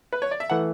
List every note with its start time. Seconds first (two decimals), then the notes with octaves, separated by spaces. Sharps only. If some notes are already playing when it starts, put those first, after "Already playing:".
0.13 B4
0.22 C#5
0.31 D5
0.40 E5
0.50 E3 A3 F#5